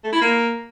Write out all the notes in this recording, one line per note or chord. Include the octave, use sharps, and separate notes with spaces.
A3
E4
A#3